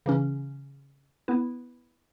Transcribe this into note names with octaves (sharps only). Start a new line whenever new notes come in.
C#3 E3 C#4
B3 E4 B4